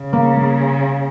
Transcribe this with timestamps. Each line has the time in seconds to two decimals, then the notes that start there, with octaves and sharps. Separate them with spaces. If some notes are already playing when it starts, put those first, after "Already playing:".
Already playing: C#3
0.13 A#3
0.37 A#3